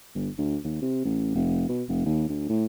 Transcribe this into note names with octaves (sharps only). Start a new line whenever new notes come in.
G1
D2
D#2
C3
A1
F1
B2
F1
D#2
D2
A2